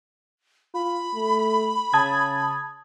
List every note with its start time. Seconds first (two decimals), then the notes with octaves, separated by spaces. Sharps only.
0.74 F4 B5
1.15 A3
1.93 C#3 A5 D#6 G#6